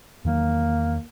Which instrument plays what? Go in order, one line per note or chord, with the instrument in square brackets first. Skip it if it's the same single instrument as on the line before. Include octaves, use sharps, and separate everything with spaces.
[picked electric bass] E2 D#3 F#3 [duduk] A#3